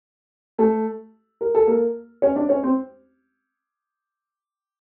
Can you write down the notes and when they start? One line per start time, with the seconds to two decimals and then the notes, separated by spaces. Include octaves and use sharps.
0.58 A3 A4
1.41 A#4
1.55 A4
1.67 A#3 A#4
2.22 C#4 C#5
2.36 D4 D5
2.49 C#4 C#5
2.63 C4 C5